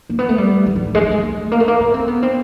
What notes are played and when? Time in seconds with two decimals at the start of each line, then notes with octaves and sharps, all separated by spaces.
0.09 A#3
0.19 B3
0.29 A3
0.38 G3
0.66 G3
0.76 F#3
0.85 F3
0.95 G#3
1.03 A3
1.11 G#3
1.23 A3
1.51 A#3
1.60 A3
1.68 A#3
1.80 C#4
1.94 C4
2.08 B3
2.23 C4